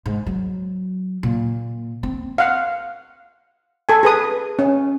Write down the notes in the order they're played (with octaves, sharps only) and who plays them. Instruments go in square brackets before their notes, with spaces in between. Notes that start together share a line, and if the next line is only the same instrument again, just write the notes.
[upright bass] G#2
F#3
A#2
C4
[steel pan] F5 F#5
A4 G#5
G#4 B4 D#6
C#4